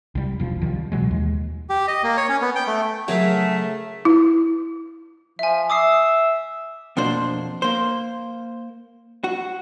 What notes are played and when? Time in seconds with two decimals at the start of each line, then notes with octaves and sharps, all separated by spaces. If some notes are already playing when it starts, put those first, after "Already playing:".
0.15 C2 G3
0.40 E1 F3
0.62 C2 D#3 F3 G3
0.92 B2 E3 F#3 G#3
1.11 D#2 G#3
1.69 G4
1.88 D#5
2.04 A#3
2.17 C#5
2.29 C#4
2.41 B3
2.55 G5
2.67 A3
3.08 C#3 F#3 A3 G#4 A#4 E5 F5
4.05 E4
5.39 F3 E5 G#5
5.70 E5 D6 D#6 C7
6.97 F2 B2 A#3 D4 C5
7.62 A#3 C5
9.24 F#4